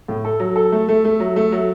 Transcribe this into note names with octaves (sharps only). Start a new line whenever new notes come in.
A2
A4
F#3
A4
A3
A3
A3
F#3
A3
F#3